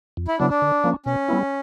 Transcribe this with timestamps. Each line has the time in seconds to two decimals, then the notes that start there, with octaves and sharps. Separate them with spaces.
0.17 F2
0.28 E4
0.39 C#3 F#3 B3 D4 E4
0.50 D4
0.62 D3
0.84 F3 A#3 C#4
1.06 B2 C#4
1.29 G3 B3 E4